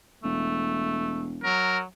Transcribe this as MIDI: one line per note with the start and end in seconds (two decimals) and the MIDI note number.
0.24 1.51 28
0.24 1.34 57
1.43 1.83 54
1.43 1.79 70